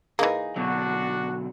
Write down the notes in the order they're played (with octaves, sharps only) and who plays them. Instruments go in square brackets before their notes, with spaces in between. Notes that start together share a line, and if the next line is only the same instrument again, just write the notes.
[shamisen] E3 A#3 [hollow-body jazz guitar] D#4 G#4
[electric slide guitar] B2 D3 F#3 [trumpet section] D4 F#4